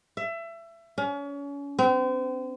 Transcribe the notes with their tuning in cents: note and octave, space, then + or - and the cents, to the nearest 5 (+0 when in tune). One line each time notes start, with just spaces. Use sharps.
E5 +25
C#4 +35
C4 -35